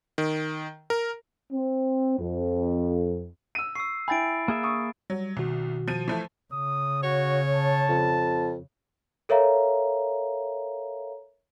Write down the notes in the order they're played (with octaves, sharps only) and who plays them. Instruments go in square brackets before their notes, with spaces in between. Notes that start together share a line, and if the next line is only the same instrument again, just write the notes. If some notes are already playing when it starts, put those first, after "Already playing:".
[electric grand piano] D#3
A#4
[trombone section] C4
F2
[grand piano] E6 D#7
[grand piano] C#6 [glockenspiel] E6 C7
[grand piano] E4 G5 G#5 [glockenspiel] B5 A6 D7
[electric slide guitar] A#3 G#4 E5
[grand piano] C#6 D#6
[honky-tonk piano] F#3 [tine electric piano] G3
[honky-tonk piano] C2 [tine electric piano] B2 D#3 F#4
[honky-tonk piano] F3 D#7
E3 F3 A3
[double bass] C#3 [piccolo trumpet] D#6
[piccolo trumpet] F#4 [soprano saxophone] C#5
[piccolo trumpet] A5
[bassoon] F2
[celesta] A4 A#4 C#5 E5 F5 A#5